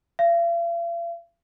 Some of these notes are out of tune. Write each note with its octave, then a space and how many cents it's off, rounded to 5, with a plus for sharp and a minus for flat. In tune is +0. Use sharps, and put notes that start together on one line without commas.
F5 -45